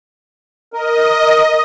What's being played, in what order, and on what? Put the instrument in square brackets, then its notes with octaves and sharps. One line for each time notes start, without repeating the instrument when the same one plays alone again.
[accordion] A#4 [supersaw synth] D#5